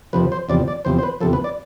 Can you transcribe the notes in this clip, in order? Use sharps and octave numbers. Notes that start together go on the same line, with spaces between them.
F2 C3 F3 B4
C5
E2 C3 F3 D5
D5
E2 C3 F3 C5
C5
B4
E2 C3 F3 A4
B4
D5